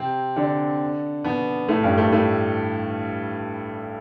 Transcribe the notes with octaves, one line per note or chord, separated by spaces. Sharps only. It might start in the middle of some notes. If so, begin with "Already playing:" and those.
Already playing: C3 C4
D3 D4
B2 B3
A2 A3
G2 G3
A2 A3
A2 A3